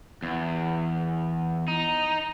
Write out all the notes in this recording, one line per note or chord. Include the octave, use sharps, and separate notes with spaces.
E2
D#4